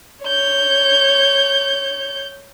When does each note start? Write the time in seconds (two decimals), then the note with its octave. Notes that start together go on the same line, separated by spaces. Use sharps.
0.24 C#5 G6